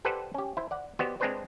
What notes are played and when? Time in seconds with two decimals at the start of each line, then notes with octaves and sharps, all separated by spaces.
0.05 G4 A4 B4 C5 D5 F#5
0.34 C#4 G4
0.57 E4 C5
0.71 D5 F#5
0.99 B3 F#4 G4 C5 D5 D#5
1.20 G#3 C4 D4 B4 C5 D5